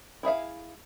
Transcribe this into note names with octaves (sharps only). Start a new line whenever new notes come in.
E4 G#4 E5 F5